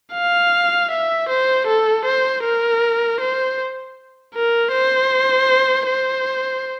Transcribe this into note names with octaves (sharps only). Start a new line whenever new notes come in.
F5
E5
C5
A4
C5
A#4
C5
A#4
C5
C5